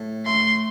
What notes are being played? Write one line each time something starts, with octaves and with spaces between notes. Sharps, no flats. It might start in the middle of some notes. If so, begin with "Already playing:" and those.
Already playing: A2
A3 C6